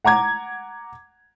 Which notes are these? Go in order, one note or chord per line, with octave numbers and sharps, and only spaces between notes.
F#5 A#5 D6 G#6